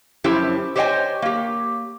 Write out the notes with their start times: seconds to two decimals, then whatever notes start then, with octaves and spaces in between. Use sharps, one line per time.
0.24 F#2 F3 C#4 E4 G4 C5
0.76 G4 C5 C#5 D#5 G5 G#5
1.22 A#3 G4